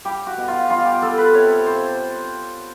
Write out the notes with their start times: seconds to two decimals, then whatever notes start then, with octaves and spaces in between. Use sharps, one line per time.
0.05 G3 G4
0.26 F#4
0.38 B2
0.48 F4
0.70 G3 F4
0.85 G4
1.02 G3 A4
1.18 B4
1.33 C3 C#5
1.66 C3 C5